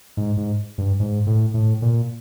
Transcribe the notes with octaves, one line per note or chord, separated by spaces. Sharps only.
G#2
G#2
G2
G#2
A2
A2
A#2